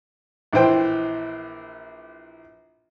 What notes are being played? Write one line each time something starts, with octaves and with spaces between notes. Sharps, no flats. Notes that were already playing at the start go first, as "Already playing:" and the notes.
A#1 E3 C5 G5